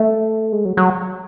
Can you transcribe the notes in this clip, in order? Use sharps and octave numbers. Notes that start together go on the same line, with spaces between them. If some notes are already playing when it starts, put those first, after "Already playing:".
Already playing: A3
G#3
F#3
F#3